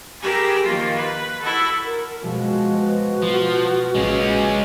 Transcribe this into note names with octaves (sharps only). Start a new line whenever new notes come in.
G4 G#4 A#4 A#5 B5 E6
D#3 F3 A#3 F4
B4
E4 F#4 A4
A#4
B2 F3 G#3 F#4
B4
B2 F3
A#1 G#3 C#4